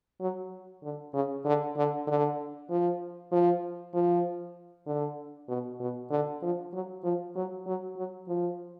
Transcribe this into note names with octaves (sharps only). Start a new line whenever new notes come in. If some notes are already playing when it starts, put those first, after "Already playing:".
F#3
D3
C#3
D3
D3
D3
F3
F3
F3
D3
B2
B2
D3
F3
F#3
F3
F#3
F#3
F#3
F3